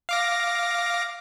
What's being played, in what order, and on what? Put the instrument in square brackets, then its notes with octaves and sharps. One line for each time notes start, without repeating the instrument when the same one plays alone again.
[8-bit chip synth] F5 D6 A#6